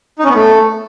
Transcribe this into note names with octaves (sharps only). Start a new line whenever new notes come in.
D#4
C#4
B3
A3